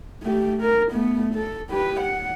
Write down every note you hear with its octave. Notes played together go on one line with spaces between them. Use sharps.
A3 G4
A#4
A3 B3
A4
G4 B4
F#5